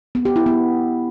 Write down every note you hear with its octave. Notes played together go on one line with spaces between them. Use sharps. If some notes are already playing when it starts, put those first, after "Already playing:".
B3
G4
E4
B3